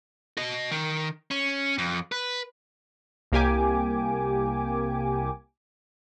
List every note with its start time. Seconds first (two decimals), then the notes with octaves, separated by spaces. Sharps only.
0.37 F#4 D#5
0.71 D#3
1.31 C#4
1.78 F2
2.12 B4
3.32 C2 A#3 G4 G#5 D6